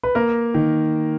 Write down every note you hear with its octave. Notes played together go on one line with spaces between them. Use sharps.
B4
A#3 A#4
D#3